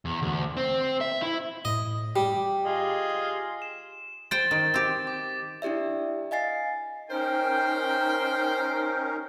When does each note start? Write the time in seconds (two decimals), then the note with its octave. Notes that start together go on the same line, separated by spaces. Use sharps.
0.05 E2
0.22 D2
0.57 C4
1.01 E5
1.22 E4
1.65 A2 D#5
2.16 G3 G4
2.64 F4 G#4 D#5
3.62 E7
4.31 C5 G5 A6
4.51 D#3
4.74 C4 G4
5.07 D6
5.62 D4 E4 G4 D5 E5
6.31 D#5 F5 G#5 A6 C7
7.10 C#4 D#4 A#4 C5 G5